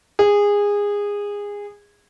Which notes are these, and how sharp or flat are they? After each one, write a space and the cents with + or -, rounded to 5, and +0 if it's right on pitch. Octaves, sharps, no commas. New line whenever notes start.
G#4 -20